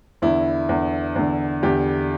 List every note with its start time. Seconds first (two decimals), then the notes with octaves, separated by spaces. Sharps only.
0.22 E2 D3 E4
0.69 E2 D3
1.16 E2 D3
1.63 E2 D3 G4